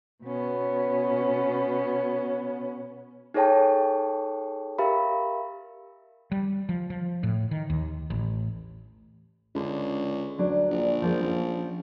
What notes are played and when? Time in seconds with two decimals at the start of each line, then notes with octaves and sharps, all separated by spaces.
0.23 B2 B3 C#4
3.34 D#4 G#4 A4 C#5 G5 A5
4.78 G4 A#4 E5 F5 B5
6.32 G3
6.69 F3
6.90 F3
7.23 A2
7.51 D#3
7.70 D#2
8.10 A1
9.55 C#2 D3
10.38 D2 F#3 D4
10.71 A#1
11.02 F3 G#3 A#3
11.23 F3 C#4 F4